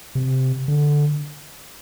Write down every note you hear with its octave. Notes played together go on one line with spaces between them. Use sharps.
C3
D3